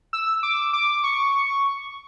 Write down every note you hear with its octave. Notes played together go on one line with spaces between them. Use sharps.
E6
D6
D6
C#6